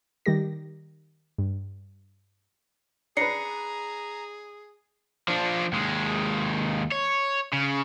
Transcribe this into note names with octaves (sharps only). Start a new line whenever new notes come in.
D#3 G3 G4 A#6
G2
D4 G#4 B4 A#5 C7 C#7
F3 D4
D#2 G#3
C#5
C#3